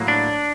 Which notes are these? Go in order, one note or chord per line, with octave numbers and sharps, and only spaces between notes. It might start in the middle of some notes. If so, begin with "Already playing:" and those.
Already playing: A2 F#3 A#3
D4